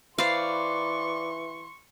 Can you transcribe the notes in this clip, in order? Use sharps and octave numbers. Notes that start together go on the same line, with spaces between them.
E3 B4 C5 D5 F5 C6 C#6